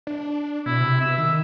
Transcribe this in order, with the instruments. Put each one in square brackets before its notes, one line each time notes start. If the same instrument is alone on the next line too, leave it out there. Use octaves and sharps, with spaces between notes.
[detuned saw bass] D4
[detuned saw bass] B2 [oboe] E4
[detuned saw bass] C3
[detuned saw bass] B2 [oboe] E5
[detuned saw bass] D#3